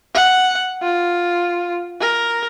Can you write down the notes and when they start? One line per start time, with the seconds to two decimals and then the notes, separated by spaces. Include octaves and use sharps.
0.15 F#5
0.82 F4
2.00 A#4